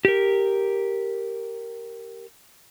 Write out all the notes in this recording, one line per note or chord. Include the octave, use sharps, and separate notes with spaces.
G4 A#4